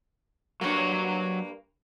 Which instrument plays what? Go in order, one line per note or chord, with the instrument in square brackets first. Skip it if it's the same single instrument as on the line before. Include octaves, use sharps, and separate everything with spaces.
[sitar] G2 A#3 [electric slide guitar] F#3 C#5